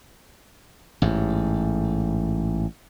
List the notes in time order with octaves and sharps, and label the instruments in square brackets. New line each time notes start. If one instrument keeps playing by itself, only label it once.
[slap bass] A1 G#2